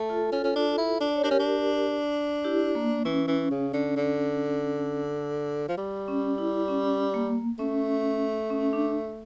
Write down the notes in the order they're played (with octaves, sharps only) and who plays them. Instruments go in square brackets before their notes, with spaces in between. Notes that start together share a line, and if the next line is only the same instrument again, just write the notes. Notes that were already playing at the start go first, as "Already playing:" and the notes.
Already playing: [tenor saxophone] A3
[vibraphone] F4 A4
[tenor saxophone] C#4 [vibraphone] F4 A4
[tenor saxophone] C#4
D4
E4
D4
[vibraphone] D5
C#5
[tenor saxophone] D4 [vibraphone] G4 A#4
[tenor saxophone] C#4
D4
[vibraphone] E4 G4
A#3
[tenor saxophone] E3 [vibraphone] C#4
[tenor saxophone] E3
C#3
D3
D3
F3
G3
[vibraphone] C#4
E4
C#4
A#3
[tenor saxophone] A3 [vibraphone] C#4
[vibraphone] C#4
D4